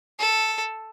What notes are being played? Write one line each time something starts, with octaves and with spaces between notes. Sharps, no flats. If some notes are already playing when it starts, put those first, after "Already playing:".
A4